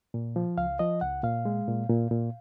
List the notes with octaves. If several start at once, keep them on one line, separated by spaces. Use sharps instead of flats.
A#2
F3
C#2 F5
F3 D#5
C#2 F#5
A#2 F5
G#3
A#2
A#2
A#2